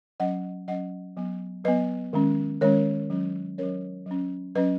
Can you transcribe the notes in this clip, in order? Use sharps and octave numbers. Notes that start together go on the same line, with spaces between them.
F#3 C#4 D#5 F#5
F#3 C#4 D#5 F#5
F#3 B3
F#3 B3 B4 D#5
D#3 G#3 C#4
D#3 G#3 C#4 A#4 C#5
F#3 C#4
F#3 C#4 A#4 C#5
F#3 C#4
F#3 C#4 B4 D#5